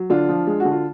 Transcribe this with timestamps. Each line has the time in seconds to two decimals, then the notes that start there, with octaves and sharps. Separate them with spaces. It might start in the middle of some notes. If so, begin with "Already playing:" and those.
Already playing: F#3
0.10 D3 D4 F4
0.29 F3
0.47 G#3
0.60 D3 F#4
0.71 F4